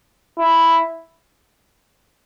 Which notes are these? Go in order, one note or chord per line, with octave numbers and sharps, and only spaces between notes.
E4